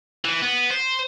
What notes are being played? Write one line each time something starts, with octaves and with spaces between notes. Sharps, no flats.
E3
B3
C5